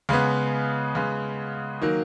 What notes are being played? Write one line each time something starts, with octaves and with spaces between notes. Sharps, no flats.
C#3 G#3 B3
C#3 G#3 B3
D#3 F#3 A#3